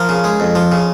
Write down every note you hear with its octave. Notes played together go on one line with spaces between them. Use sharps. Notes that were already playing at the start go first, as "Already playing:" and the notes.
Already playing: F3 A#4
C#3
G#3
F2
F3
C#3